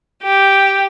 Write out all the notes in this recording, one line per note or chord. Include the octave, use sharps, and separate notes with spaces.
G4